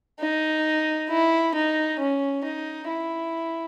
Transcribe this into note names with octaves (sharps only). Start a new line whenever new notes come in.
D#4
E4
D#4
C#4
D#4
E4